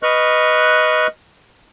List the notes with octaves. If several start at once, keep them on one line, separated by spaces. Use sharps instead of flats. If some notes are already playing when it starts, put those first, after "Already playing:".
B4 D#5 C#6 F6 F#6